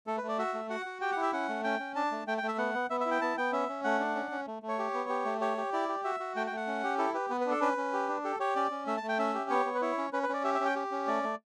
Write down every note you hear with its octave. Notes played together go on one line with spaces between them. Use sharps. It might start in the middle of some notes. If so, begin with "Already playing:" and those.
A3 A4
B4
A3
D5
F#4 E5
A3
F#4 F#5
F#4
G4 G5
F#5
E4
E5
C#4 F#5
A3
C#4 G5
C#4
D4 A5
A3
A3 G5
G5
A3
E5
B3 F#5
B3
B3 E5
E5
E4
G5
B3 A5
B3 G5
C#4 E5
C#4
A3 F#5
D4
C#4
C#4
A3
A3
C#5
G4
B3
G4
A3
G4 C#5
G4
E4 D5
G4
F#4 E5
F#4
A3 G5
G5
A3
F#5
C#4
G4
E4 A4
G4 B4
B3 B4
B4
D4 A4
C#4 B4
C#4
G4
D4
G4 A4
G4 C#5
C#4 D5
C#4
A3 E5
A5
A3
G5
C#4 E5
G4
B3 C#5
B3
B4
E4 C#5
C#4
C#4 B4
B4
C#4 D5
G4 E5
E5
C#4 G5
G4
C#4
A3 D5
A3